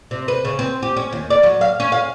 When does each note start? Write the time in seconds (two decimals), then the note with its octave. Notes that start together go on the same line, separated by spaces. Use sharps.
0.11 C3
0.28 B4
0.45 C#3
0.59 C4
0.82 G4
0.97 C#4
1.12 D#2
1.30 D5
1.43 F#3
1.61 F5
1.80 C#4
1.92 F5